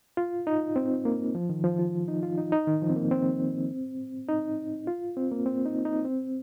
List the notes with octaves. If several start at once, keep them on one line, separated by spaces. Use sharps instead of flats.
F4
D#4
C4
A#3
F3
D#3
F3
F4
D#4
F4
D#4
D#4
D#3
F3
C4
A#3
C4
D#4
F4
C4
A#3
C4
D#4
D#4
C4